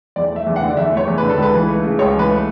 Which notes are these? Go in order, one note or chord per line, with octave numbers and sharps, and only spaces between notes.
E2 D5
A3 E5
E2
F#5
D3
D5
E2 E5
A3 C#5
E2
D3 B4
A4
C#2 B4
E3
A3
C#3
C#2 C#5
E3 B4
A3